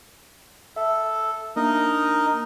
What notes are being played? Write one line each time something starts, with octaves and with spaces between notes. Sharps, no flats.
A4 E5
A#3 D4 D#4 A#4 D#5